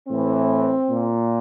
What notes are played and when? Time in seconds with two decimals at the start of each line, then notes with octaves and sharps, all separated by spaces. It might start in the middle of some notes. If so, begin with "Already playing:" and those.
0.09 A2 E3 C4
0.89 A#2